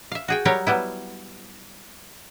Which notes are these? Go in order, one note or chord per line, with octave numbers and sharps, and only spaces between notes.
E5 F5
F#4 G#4 G5
F#3 G3 G4 A#4 C#5
F#3 G3 B3 E4